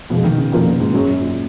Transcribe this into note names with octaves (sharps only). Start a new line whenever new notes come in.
F2 B2 F3 G#3
D#3
C#3
F2 B2 F3 A#3 F4 A#4
A#2
G#2
F#2 F#3 C#4 G#4
F#2
A#2